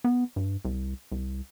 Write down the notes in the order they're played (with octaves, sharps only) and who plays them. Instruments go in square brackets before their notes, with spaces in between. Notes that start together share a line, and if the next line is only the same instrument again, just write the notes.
[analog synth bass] B3
G2
C2
C2